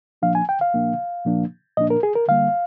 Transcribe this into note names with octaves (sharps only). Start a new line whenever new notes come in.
A#2 F3 A#3 D4 F5
G#5
G5
F5
A#2 F3 A#3 D4
A#2 F3 A#3 D4
A#2 F3 A#3 D4 D#5
A#4
G#4
A#4
D3 G3 A#3 F5